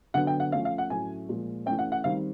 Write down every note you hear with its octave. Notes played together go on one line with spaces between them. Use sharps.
D3 F#3 B3 D4 F#5
G5
F#5
F3 A3 C#4 F5
F5
F#5
A2 F#3 A3 C#4 G#5
A#2 F3 G#3
E3 A3 C#4 G5
F#5
F#5
D#3 G3 C4 F5